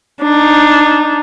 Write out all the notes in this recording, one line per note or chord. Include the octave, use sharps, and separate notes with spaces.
D4 D#4